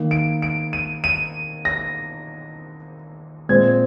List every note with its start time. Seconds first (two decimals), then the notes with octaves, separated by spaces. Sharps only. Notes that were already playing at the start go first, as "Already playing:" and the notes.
Already playing: D#3 A#3
0.11 D7
0.42 D7
0.73 D#7
1.04 D#7
1.65 A#6
3.49 A#2 G#3 C4 G#6